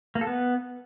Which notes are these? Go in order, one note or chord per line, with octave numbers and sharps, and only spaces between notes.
A#3
A4
B3